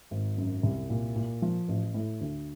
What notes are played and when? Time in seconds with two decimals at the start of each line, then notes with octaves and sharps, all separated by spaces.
0.11 G#1
0.38 F#2
0.63 C2
0.90 A#2
1.16 A#2
1.42 F3
1.68 A1
1.94 A2
2.21 D2